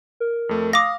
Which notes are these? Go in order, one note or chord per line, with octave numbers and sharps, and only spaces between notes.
A#4
F2 A3
F5 D6 D#6 A#6